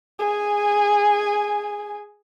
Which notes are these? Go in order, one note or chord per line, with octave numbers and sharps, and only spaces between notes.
G#4 G#5